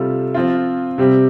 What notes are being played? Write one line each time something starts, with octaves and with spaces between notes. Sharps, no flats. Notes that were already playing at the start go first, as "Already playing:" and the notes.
Already playing: C3 G3 F4 A4
F3 C4 F4
C3 G3 C4 G4